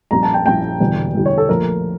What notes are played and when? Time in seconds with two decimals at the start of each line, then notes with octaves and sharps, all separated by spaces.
0.11 A#1 A#2 G3 C#4 A#5
0.23 A5
0.34 G5
0.46 A#1 A#2 G3 C#4 G5
0.80 E1 E2 D3 G3
1.15 E1 E2 D3 G3
1.26 C#5
1.38 A4
1.48 A#1 A#2 F3 A3 A#4